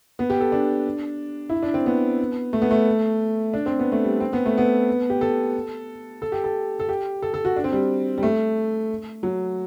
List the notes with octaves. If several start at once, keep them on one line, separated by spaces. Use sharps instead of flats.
B3
G4
A4
D4
E4
D4
C4
B3
A3
B3
A3
D4
C4
B3
A3
G3
C4
B3
A3
B3
G4
A4
A4
G4
A4
A4
G4
A4
A4
F#4
D4
C4
G3
G3
A3
F#3